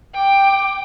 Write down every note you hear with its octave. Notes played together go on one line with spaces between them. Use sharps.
G5 D6